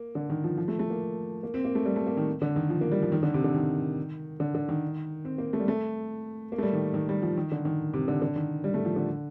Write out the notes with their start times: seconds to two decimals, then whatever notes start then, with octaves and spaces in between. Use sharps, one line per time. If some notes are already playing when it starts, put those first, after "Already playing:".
Already playing: A#3
0.15 D3
0.30 D#3
0.44 F3
0.58 F3
0.68 A3
0.79 A3
0.90 A#3
1.43 A#3
1.54 C4
1.65 A#3
1.75 A3
1.85 G3
1.96 A3
2.06 A#3
2.17 D#3
2.42 D3
2.56 D#3
2.70 F3
2.81 A#3
2.91 G3
3.02 F3
3.12 D#3
3.23 D3
3.34 C3
3.44 D3
3.54 D#3
4.40 D3
4.55 D3
4.69 D#3
5.25 C4
5.38 A#3
5.53 A3
5.60 G3
5.68 A3
6.52 A#3
6.58 A3
6.63 G3
6.73 D#3
6.94 D#3
7.09 G3
7.22 F3
7.37 D#3
7.51 D3
7.65 D#3
7.94 C3
8.08 D3
8.22 D3
8.36 D#3
8.64 G3
8.74 A3
8.85 F3
8.96 D3